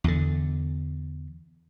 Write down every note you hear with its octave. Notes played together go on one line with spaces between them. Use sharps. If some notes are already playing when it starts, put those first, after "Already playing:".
E2 D3